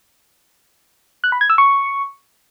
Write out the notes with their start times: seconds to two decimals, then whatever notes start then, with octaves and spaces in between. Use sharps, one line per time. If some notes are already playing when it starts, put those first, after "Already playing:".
1.24 F#6
1.32 B5
1.41 G#6
1.50 E6
1.58 C#6